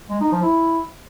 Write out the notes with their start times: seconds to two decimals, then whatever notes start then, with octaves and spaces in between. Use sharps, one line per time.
0.10 G#3
0.21 D#4
0.31 F3
0.42 E4